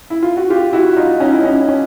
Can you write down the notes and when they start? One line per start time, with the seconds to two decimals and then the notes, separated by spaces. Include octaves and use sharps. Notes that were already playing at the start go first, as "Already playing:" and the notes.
0.10 E4
0.23 F4
0.37 F#4
0.50 F4 G4
0.73 E4 F#4
0.97 D#4 F4
1.20 C#4 D#4
1.33 E4
1.44 C#4 D#4
1.69 C#4